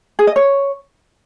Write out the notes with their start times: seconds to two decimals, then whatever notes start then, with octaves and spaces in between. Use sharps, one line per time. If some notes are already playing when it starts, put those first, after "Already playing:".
0.19 G#4
0.27 D#5
0.36 C#5